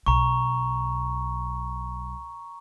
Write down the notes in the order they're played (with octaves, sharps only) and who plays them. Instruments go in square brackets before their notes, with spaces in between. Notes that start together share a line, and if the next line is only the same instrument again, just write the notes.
[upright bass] B1 [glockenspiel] A#5 C#6